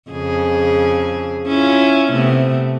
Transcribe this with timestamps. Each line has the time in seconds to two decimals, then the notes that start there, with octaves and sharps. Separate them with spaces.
0.10 F2 C#3 G#4
1.47 C#4 E4 F4
2.12 C3 A3 B3